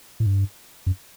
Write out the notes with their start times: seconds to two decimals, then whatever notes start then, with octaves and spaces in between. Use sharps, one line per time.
0.20 A2
0.26 G2
0.87 F#2